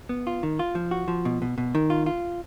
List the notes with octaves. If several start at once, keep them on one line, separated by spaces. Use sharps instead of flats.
B3
F4
D#3
F4
F3
F#4
F3
B2
B2
B2
D#3
F4
F4